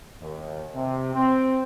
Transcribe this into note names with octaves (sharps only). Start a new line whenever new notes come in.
D#2
C3
C4